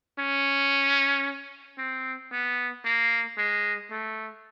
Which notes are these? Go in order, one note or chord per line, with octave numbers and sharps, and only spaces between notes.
C#4
C4
B3
A#3
G#3
A3